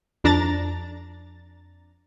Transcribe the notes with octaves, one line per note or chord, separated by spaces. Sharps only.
F2 D4 A#5 A6